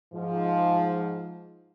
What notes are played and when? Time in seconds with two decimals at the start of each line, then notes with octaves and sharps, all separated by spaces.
0.14 G#2 F3